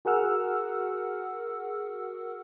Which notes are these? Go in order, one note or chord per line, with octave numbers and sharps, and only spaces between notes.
F#4 G#4 A#4 F#5 E6 F6